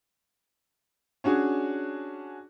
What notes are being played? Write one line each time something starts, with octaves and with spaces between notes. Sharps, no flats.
C#4 D4 F#4 G#4